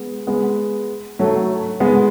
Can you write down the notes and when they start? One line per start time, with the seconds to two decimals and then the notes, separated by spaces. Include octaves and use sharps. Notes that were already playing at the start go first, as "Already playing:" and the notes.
Already playing: G#3 B3
0.27 G#3 B3
1.19 F#3 A3
1.80 G#3 B3